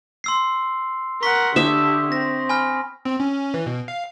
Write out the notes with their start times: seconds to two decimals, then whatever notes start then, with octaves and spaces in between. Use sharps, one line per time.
0.24 C6 E6 C7
1.23 A#4 F#5 C#6 B6
1.56 D3 G4 E5 D#6
2.12 C4 A#6
2.49 G#5 B5 F6
3.05 C4
3.20 C#4
3.54 E3
3.66 B2
3.88 F5